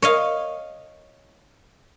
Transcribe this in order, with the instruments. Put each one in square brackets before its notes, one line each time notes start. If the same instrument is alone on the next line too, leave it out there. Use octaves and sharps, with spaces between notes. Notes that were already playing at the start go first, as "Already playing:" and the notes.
[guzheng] C#5 D#5 F5